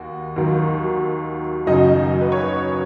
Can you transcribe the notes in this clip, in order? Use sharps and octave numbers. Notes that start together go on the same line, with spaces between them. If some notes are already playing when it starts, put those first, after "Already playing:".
Already playing: D#2 F#4
D#2 D#3 F#3
F#1 F#2 C#3 F#3 D#4 D#5
B4
C#5